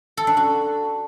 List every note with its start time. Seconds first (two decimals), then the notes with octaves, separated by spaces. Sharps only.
0.17 A4
0.27 D4
0.37 F#4